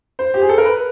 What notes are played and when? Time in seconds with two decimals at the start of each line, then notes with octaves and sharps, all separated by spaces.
0.19 C5
0.34 G4
0.42 G#4
0.49 A4
0.58 A#4
0.65 B4